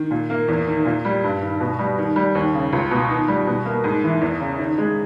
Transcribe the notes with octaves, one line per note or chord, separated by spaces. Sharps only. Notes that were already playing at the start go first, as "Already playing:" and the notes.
Already playing: D#3
A#2
A#3
E2
D#3
A#2
G3
G2
D#3
B2
G3
D#3
G3
D#2
C#3
C#2
B2
D#3
G3
B2
A#3
G#2
E3
E2
C#3
D#3
G#3